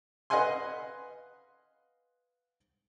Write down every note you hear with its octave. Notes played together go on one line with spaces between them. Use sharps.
B4 D#5 F5 F#5 G#5 C6